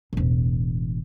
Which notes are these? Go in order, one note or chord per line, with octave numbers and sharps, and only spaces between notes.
E1 A1